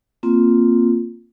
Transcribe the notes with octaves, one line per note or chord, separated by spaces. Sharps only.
A#3 C4 F4